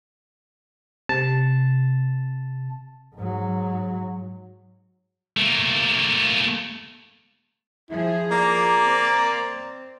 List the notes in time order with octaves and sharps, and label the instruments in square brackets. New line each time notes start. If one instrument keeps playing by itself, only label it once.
[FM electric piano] C3 [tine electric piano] A5
[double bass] G#2 F#3
[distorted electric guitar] A3 A#3
[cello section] F3 G#4 [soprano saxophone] E4
[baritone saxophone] A#3 [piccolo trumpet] D5 [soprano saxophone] A#5
[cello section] C4